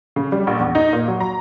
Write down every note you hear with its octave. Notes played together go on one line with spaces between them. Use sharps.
C#3
G3
A#1
E2
D#4
A#2
F#3
A#5